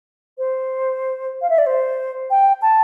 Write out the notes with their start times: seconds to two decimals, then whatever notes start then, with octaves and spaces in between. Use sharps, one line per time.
0.38 C5
1.42 F5
1.50 E5
1.58 D5
1.66 C5
2.30 G5
2.62 A5